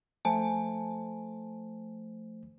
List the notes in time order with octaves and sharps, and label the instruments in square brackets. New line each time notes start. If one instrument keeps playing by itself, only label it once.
[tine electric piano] F3 A3 C5 [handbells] G#5 A5